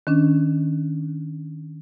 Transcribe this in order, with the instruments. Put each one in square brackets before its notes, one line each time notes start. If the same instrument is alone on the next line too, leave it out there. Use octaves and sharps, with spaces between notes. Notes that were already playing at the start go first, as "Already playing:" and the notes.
[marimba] D#3 C#4 D4